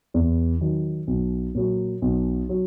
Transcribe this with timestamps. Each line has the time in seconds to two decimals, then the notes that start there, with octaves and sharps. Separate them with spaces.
0.14 E2
0.61 D#3 F#3
1.07 B1
1.55 A#2 F#3
2.02 B1
2.49 F#3